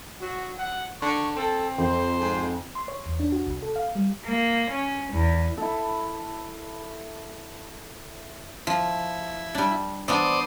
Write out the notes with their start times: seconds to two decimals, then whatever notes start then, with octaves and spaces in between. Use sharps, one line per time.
0.21 F#3 F#4
0.58 F#5
1.02 D3 C#6
1.36 C4 A4
1.78 F2 C5
2.20 G#2
2.75 C6
2.88 C#5
3.06 E2
3.20 D4
3.32 F#4
3.47 C2
3.62 A4
3.76 F5
3.95 G3
4.25 A#3
4.70 C#4
5.13 E2
5.58 E4 A4
8.67 F3 E4
9.55 G3 D4
10.08 E3 B3 D4 C5 D5 D#6